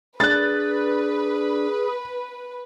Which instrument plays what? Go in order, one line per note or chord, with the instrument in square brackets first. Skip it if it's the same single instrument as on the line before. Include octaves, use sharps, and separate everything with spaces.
[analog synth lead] D4 [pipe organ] G#4 [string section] B4 [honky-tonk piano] F#6 A6